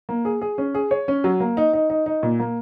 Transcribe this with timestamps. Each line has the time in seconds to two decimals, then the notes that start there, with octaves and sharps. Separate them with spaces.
0.09 A#3
0.25 G#4
0.41 G#4
0.58 C#4
0.74 G#4
0.91 C#5
1.08 C#4
1.24 F#3
1.40 A#3
1.57 D#4
1.73 D#4
1.90 D#4
2.06 D#4
2.23 A#2
2.40 A#3